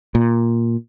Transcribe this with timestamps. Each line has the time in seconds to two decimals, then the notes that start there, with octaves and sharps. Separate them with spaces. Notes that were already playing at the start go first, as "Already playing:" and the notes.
0.15 A#2